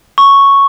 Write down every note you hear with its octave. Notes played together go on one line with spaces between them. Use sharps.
C#6